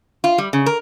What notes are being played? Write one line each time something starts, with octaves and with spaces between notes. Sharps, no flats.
F4
G3
C#3
A#4